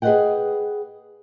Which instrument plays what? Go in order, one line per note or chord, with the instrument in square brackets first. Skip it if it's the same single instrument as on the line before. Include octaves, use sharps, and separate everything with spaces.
[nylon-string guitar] G#4 B4 D5 D#5 F#5 G5